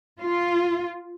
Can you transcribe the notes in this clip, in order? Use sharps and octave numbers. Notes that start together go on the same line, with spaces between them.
F4